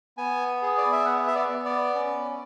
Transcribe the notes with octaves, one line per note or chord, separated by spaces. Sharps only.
B3 G#5
G#4
D5
E5
B3 F#5
E5
D5
B3
D5
C#4